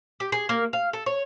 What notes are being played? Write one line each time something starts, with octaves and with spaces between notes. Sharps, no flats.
G4
G#4
A#3
F5
A4
C#5